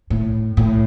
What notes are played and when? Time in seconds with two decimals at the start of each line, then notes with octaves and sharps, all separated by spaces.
0.10 A2
0.57 A2